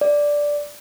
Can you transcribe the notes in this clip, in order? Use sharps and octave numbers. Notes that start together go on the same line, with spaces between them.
D5